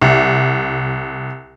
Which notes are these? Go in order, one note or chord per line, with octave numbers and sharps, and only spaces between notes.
C2